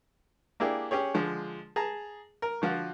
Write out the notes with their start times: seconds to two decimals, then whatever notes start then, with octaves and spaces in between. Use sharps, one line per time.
0.60 A#3 D4 E4 G4 G#4
0.91 C#4 G4 G#4 C#5
1.14 D3 F3 G#3
1.76 G#4 A5 A#5
2.42 A#4
2.62 D3 F3 F4 F#4